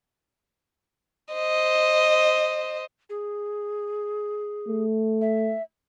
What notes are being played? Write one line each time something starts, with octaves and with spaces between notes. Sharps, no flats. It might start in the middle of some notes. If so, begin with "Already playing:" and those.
C5 D#5
G#4
A3
E5